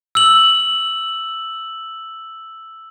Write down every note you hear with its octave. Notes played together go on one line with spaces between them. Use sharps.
E6 F#7